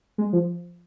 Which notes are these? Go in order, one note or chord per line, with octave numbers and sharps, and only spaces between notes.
G#3
F3